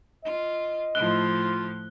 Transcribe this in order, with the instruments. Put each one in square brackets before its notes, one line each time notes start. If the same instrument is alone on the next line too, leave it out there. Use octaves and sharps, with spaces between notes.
[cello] F4 [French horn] D#5
[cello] A2 F3 [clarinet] F4 [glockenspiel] F#6 G7